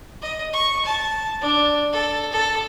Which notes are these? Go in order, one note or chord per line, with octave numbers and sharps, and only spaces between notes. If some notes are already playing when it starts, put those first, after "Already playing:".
D#5
C#6
A5
D4
A4
A4